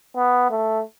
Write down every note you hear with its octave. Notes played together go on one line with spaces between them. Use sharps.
B3
A3